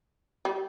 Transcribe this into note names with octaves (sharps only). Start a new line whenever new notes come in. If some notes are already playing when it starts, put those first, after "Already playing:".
G3